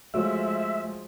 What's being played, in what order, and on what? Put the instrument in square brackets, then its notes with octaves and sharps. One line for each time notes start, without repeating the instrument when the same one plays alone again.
[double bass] F3 G#3 [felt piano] A3 F#4 C#5 [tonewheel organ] E5